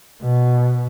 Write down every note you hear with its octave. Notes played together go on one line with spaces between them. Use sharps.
B2